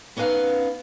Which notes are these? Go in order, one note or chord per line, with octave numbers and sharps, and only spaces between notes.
B3 C#4 D#4 B4 F5